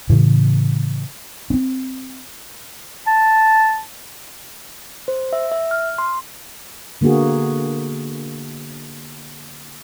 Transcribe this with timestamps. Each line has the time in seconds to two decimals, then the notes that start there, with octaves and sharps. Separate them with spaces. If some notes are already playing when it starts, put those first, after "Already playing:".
0.09 A2 C#3 E3
1.50 C4 C#4
3.07 A5
5.08 C5
5.33 E5
5.51 E5
5.71 F6
5.98 C6
7.01 D3 A#3 B3 F#4 G#4